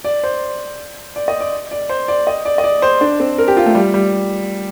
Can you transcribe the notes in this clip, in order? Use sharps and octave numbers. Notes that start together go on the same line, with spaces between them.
D5
C5
D5
D#5
D5
D5
C5
D5
D#5
D5
D#5
D5
C5
D4
C4
A#4
G4
F4
A3
G3
G3